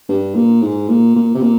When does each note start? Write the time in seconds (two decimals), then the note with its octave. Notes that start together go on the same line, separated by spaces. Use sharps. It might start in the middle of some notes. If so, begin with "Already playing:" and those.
0.09 G2
0.35 A#2
0.62 G#2
0.88 A#2
1.16 A#2
1.34 C3
1.41 A#2